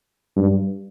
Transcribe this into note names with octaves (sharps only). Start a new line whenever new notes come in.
G2